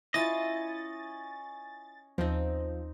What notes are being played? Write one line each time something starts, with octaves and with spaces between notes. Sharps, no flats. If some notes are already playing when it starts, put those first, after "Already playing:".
C#4 E4 F4 D#5 A6
D#2 F3 C4 D#4